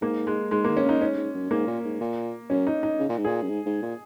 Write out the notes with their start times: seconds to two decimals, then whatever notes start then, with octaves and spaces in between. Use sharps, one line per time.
0.01 G#2 A#3
0.27 G#3
0.51 G#2 G#3
0.65 D#3 A#3
0.77 C#4
0.85 C#3 D#4
1.01 G#2 C#4
1.17 G#2
1.34 F#2
1.51 G#2 A#3
1.67 A#2
1.84 G#2
2.01 A#2
2.50 F#2 C#4
2.67 D#4
2.83 D#4
2.99 C#3
3.09 A#2
3.18 G#2
3.25 A#2 G#4
3.43 F#2
3.49 G#2
3.66 G#2
3.82 A#2